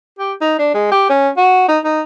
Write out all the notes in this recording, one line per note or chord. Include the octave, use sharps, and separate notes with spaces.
G4
D#4
D4
G#3
G4
C#4
F#4
D#4
D#4